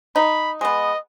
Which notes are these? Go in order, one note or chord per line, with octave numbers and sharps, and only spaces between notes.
D#4 B5
G#3 B3 D#5